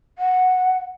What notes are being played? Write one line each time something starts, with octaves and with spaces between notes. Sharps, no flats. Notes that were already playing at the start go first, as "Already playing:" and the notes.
F#5